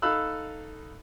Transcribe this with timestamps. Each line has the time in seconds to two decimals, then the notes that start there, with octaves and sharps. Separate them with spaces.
0.02 D#4 A4 F5 B5 E6 F#6